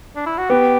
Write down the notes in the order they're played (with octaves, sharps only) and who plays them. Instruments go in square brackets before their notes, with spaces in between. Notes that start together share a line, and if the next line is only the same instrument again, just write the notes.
[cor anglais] D4
E4
F#4
[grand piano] B3 [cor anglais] G4